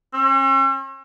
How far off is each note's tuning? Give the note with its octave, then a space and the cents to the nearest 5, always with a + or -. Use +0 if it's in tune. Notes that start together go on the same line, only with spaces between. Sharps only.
C#4 -45